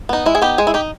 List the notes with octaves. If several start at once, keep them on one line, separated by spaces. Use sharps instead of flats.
B3 D#4
G#3 E4
G#4
B3 D#4 G4
G#3 G#4
E4
D#4 G4